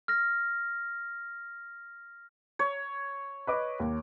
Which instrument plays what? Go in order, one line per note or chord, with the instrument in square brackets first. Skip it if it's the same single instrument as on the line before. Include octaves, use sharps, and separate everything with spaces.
[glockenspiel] F6 A#6
[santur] C#5
[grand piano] B4 D#5 D6
D#2